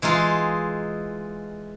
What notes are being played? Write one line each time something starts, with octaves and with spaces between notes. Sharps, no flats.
E3 G#3 D#4 F4